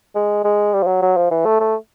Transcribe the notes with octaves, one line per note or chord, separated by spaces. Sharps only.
G#3
G#3
G3
F3
F#3
F#3
F3
E3
A3
A3